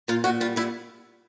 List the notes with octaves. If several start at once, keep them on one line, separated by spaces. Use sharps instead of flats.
A#2 F4
A#2 F#4
G3 F4
A#2 E4